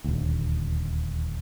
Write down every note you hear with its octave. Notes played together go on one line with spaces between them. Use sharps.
D#1 D2